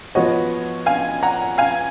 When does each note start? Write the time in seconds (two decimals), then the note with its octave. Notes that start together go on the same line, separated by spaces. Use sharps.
0.15 F3 B3 F#4 C#5 D#5 F#5
0.86 F5 G#5
1.23 F#5 A#5
1.58 F5 G#5